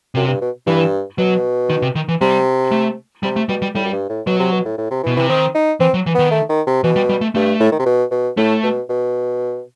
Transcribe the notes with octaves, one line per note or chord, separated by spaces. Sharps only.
F#2 C3
G2
B2
G2 E3
B2 F#3
D#3
C3
D#3
E3
C3 G3
A3
C3 G3
A3
B2 G3
G3
A2 G3
F#2
G2
A2
B2 F#3
C3
B2
A2
A2
C3
B2 E3
C3 E3
D#3 C4
D#4
E3 C4
F#3
E3
D#3 B3
A3
D#3
C3
B2 E3
G3
G3
A3
G2 A3
A2
D#3
C3
B2
B2
A2 A3
B2
B2